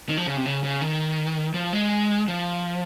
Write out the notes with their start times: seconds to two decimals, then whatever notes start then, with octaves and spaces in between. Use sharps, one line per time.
0.09 D#3
0.17 F3
0.26 C#3
0.37 C3
0.46 C#3
0.64 C#3
0.81 D#3
1.54 F3
1.73 G#3
2.28 F3